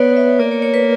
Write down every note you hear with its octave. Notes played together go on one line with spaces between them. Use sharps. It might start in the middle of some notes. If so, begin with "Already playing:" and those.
Already playing: B3 C#5 D5
E5
A#3 D5
C#5
C#5
B4